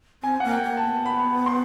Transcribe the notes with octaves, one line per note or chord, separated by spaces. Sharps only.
C4 G#5
A#3 F#5
G5
A#3
A5
B3
B5
C6